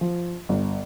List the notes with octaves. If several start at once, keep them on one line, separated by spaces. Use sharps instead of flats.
F3
G1